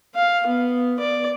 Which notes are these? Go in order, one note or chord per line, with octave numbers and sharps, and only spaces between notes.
F5
B3
D5